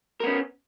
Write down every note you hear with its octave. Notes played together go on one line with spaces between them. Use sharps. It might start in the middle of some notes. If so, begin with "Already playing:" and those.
B3 C#4 A#4